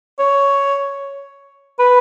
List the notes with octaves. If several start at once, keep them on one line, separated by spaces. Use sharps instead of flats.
C#5
B4